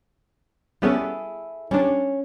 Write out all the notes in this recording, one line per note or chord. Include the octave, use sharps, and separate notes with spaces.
G3 B3 C#4 E4 G#4 A4
G3 C#4 D4